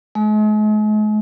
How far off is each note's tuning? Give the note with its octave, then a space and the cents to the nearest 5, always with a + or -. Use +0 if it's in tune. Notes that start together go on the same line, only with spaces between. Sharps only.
G#3 +45